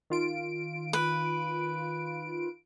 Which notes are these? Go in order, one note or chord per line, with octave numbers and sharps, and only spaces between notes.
D#3 F4 D7
B4